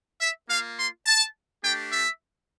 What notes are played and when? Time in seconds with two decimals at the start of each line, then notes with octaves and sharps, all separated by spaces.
0.21 E5
0.49 A#3 F4 F5
0.78 C6
1.07 A5
1.64 A3 D4 G4 G5
1.92 E5